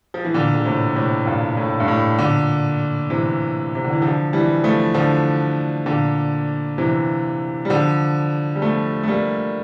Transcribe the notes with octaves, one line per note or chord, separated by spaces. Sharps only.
F3
E3
A#2 D3
D3
A2 C3
A2 C3
G2 A#2
A2
G2
A2
A#2 D3
C3 E3
C3
D3
E3
D3 F3
E3 G3
F3 A3
D3 F3
A#2 D3
C3 E3
G3
D3 F3
G3
F3 A3
A3
G3 A#3